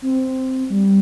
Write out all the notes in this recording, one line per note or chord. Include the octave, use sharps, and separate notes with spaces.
C4
G3